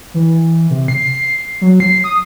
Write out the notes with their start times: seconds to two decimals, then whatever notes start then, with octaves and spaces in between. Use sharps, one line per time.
0.14 E3
0.70 C3
0.88 C7
1.61 F#3
1.80 C7
2.04 D#6